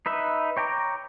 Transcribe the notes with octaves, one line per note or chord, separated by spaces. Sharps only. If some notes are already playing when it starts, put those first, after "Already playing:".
D#4 B4 E5
C#5 G5 A#5 D6